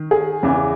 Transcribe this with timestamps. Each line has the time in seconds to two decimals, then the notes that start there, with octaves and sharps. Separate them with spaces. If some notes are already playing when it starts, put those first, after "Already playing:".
Already playing: D#3
0.11 G#4
0.43 E2 C#3 E3